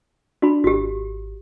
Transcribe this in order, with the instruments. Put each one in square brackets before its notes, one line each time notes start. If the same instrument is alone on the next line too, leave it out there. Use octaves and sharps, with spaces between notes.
[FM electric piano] D4 [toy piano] F#4 B5
[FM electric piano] G#1 [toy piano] F#4 G4